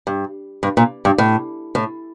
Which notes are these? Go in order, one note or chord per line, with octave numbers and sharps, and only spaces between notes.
G2
G2
A#2
G2
A2
A2